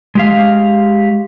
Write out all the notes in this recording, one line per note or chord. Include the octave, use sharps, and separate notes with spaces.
G#3 G4 F5